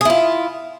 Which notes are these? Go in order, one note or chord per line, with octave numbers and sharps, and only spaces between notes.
E4 F4 G#4